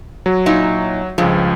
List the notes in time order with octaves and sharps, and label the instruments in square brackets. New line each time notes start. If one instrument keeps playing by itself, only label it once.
[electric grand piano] F#3 F#4
[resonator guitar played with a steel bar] A#2 D#4 E4
[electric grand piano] C#2 F3 [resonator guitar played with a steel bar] G2 G#3